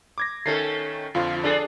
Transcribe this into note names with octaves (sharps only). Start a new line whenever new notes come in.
D6 G#6 A#6
D#3 A3 C#4 A4 A6 C7
F2 D3 F3 F4
D4 G#4 A4 D5